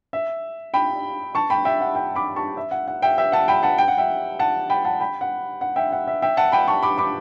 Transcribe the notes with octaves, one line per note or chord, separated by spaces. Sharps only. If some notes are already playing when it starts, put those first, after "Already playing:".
E5
G5 B5
A5 C#6
G5 B5
E5 G5
F#5
E5 G5
B5 D6
A5 C#6
E5
F#5
F#5
E5 G5
E5 G5
F#5 A5
G5 B5
F#5 A5
G5
F#5
E5 G5
F#5 A5
G5 B5
F#5 A5
G5 B5
F#5
F#5
E5 G5
F#5
E5
E5 G5
F#5 A5
G5 B5
A5 C#6
B5 D6
B5 D6